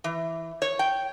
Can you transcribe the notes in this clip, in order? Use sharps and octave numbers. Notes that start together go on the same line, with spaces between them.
E3
C#5
G5